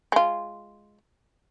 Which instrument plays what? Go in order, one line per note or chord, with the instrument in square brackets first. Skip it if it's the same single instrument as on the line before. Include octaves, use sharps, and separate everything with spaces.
[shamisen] G#3 F4